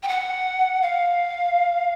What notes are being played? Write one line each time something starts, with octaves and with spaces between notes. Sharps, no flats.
G5
F#5
F5